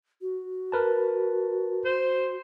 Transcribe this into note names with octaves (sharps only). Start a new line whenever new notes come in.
F#4
A#4 B4 A5
C5